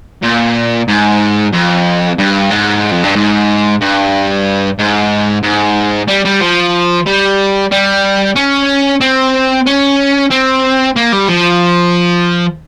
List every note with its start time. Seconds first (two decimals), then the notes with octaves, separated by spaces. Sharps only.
0.23 A#2
0.88 G#2
1.53 F2
2.18 G2
2.51 G#2
2.92 F2
3.03 G2
3.16 G#2
3.81 G2
4.79 G#2
5.43 G#2
6.08 G3
6.25 G3
6.40 F3
7.06 G3
7.71 G3
8.36 C#4
9.01 C4
9.66 C#4
10.31 C4
10.96 A#3
11.12 G3
11.28 F3